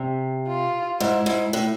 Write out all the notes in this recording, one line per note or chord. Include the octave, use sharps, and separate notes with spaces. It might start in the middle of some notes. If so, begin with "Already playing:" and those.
Already playing: C3
F4
G#2 E4
G#2
A2